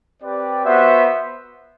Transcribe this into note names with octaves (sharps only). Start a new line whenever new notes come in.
C4 G4 B4 D5
B3 F#4 C5 E5